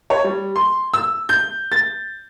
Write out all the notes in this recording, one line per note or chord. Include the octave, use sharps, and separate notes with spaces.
C#5
G3
C6
E6
G6
A6